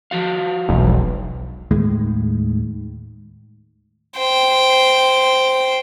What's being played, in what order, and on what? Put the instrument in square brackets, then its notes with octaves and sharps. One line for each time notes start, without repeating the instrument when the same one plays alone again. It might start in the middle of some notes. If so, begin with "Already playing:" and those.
[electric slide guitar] F3 F#4 F5
[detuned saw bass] E1 [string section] B1
[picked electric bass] D#2 A2 D#3 G#3
[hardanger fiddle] C5 G5